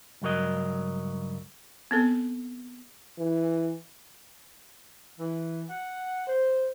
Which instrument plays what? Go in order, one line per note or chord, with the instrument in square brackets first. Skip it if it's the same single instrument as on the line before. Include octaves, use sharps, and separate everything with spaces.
[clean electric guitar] C#2 G2 F#3 A#4 D#5
[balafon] B3 C4 A4
[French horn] E3
[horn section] E3
F#5
C5